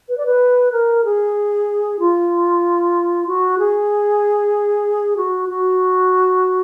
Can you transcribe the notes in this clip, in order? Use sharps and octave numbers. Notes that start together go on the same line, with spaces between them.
B4
D5
B4
A#4
G#4
F4
F#4
G#4
F#4
F#4